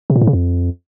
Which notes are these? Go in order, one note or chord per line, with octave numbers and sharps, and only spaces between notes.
C3
A#2
A2
C#3
F2